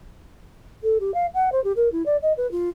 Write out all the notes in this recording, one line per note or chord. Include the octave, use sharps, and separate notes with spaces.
A4
G4
F5
F#5
C5
G4
A#4
E4
D5
D#5
B4
F4